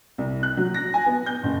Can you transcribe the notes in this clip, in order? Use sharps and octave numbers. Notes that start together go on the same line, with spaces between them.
C2
F#6
F#3
A#6
G#5
B3
G6
F#1